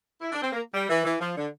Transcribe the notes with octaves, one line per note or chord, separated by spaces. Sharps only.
E4
D4
C4
A#3
G3
E3
E3
F3
D3